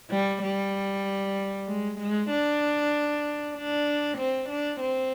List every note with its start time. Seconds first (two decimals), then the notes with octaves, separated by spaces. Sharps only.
0.10 G3
0.42 G3
1.67 G#3
1.98 G#3
2.29 D4
3.55 D4
4.18 C4
4.49 D4
4.80 C4